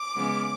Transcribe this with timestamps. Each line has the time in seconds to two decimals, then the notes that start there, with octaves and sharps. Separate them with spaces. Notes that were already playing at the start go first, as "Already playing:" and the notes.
Already playing: D6
0.15 C#3 F3 G#3 B3